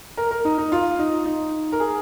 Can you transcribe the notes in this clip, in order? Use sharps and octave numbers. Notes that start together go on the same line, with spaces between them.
A#4
A#4
D#4
D#4
F4
D#4
D#4
A#4
G#4